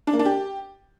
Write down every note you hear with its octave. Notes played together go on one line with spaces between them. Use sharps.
D4
A#3
D4
G4